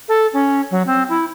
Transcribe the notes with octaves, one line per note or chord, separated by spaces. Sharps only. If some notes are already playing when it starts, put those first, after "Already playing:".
A4
C#4
F#3
C4
E4